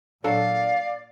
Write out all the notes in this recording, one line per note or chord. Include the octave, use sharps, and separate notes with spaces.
A#2 F#3 D4 A4 D5 F5